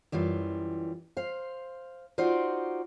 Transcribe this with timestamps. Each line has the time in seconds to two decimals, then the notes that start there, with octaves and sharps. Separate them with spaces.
0.12 F#2 E3 G3 F4
1.17 C5 F5
2.18 D#4 F4 F#4 C5 D5